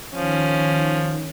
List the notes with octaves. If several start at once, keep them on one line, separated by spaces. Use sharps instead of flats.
D#3 F3 C#4